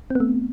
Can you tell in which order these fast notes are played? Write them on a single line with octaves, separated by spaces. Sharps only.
C4 B3 A3